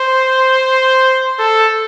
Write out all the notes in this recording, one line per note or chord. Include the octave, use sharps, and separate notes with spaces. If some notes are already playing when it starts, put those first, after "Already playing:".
Already playing: C5
A4